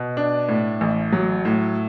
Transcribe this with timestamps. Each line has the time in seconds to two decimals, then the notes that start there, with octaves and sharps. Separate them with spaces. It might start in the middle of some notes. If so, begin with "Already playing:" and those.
Already playing: B2
0.17 D4
0.49 A2
0.81 A1
1.12 F#3
1.45 A2